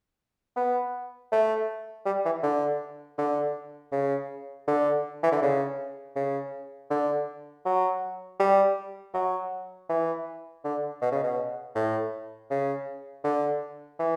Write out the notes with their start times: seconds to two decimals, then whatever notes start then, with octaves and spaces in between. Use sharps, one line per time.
0.57 B3
1.32 A3
2.06 G3
2.25 E3
2.43 D3
3.18 D3
3.92 C#3
4.67 D3
5.23 E3
5.32 D3
5.42 C#3
6.16 C#3
6.90 D3
7.65 F#3
8.40 G3
9.14 F#3
9.89 E3
10.64 D3
11.01 B2
11.12 C#3
11.23 B2
11.75 A2
12.50 C#3
13.24 D3
13.99 E3